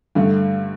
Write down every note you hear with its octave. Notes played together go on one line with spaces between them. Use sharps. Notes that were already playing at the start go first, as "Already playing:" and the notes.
G2 D3 A3